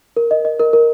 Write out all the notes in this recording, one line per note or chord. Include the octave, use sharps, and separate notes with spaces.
A#4
D#5
D#5
A#4
A#4